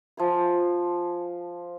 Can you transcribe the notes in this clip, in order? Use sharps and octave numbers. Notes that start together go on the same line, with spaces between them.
F3 G#5 C6